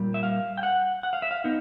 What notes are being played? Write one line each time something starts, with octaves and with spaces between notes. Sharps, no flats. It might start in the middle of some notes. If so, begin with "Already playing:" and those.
Already playing: A#2 G3
E5
F5
G5
F#5
F#5
F5
E5
F5
B3 D#4